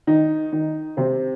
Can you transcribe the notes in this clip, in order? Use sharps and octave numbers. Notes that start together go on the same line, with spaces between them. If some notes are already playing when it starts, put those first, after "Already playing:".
D#3 D#4
D#3 D#4
C3 C4